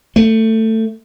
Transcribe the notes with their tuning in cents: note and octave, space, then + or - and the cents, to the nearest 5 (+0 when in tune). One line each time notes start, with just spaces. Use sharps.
A3 +15